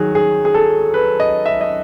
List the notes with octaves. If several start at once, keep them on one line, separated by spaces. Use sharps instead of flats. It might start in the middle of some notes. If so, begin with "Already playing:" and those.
Already playing: D#3 F#3 G#4
G#4
G#4
A4
B4
D#5
E5
D#5